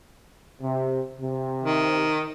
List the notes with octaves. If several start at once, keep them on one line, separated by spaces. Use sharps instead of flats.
C3
C3
D#3